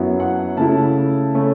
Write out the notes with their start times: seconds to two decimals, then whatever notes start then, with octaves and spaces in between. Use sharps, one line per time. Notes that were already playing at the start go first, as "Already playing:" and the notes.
Already playing: F#2 F#3 B3 E4
0.20 F#5
0.57 C#3 A3 E4 A5
1.34 C#3 A3 C#4